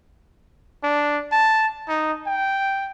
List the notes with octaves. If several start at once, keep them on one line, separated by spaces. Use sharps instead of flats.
D4
A5
D#4
G5